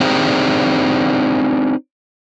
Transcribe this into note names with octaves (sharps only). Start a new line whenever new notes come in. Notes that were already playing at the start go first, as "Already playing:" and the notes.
C4 D4 D#4 G4 G#4 C5